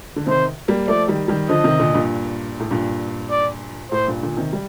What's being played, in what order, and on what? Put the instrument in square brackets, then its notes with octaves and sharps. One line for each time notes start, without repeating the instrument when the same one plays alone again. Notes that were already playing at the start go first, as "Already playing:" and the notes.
[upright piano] D3
[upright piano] C3 D#3 [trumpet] C5
[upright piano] G3 A#3
[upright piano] F3 A3 [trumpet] D5
[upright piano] D#3 G3
D#3 G3
[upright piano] D3 F3 [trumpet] D#5
[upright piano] C3 D#3
A#2 D3
G2 A#2
A2
G2 A#2
[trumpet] D5
[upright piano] A2 [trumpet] C5
[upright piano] G2 A#2
A#2 D3
C3 D#3
G3